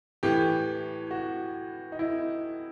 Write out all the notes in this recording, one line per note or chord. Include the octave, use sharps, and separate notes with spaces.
A2 E3 G4
F#4
D#4
E4